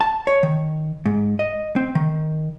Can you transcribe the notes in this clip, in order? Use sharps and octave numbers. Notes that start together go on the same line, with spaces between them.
A5
C#5
D#3
G#2
D#5
C4
D#3